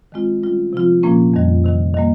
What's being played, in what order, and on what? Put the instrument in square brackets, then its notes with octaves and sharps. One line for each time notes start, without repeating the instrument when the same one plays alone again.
[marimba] D#3 G#3 C4 F4
D#3 G3 C#4 F4
C3 F3 C4 F4
A#2 F3 A#3 C#4
F2 D#3 G3
C3 D#3 G3
D#3 G3 A#3